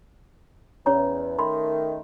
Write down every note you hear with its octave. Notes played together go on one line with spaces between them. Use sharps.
E2 C#4 C#5 A#5
D#3 A3 B5 C6